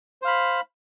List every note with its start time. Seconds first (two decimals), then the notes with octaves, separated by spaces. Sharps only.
0.22 C5
0.25 F5
0.27 B5